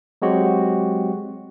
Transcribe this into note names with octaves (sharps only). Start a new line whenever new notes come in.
F#3 G#3 C4 F#4 G4